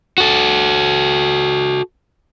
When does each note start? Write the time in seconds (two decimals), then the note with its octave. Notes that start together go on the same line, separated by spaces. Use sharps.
0.18 F#4 A4